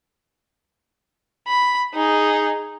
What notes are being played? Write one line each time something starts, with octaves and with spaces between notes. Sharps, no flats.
B5
D#4 G#4